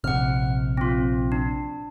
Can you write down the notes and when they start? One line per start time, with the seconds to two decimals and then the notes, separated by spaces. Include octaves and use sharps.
0.04 A#1 C3 F#5 F6
0.77 C4 F4
1.32 D4